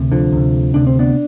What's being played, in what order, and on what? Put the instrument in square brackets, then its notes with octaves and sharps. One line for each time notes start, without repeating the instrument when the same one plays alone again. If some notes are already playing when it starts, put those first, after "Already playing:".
Already playing: [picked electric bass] D2 C3
D3 F3
D2 C3
D2 C3 D4
C4
B3 D4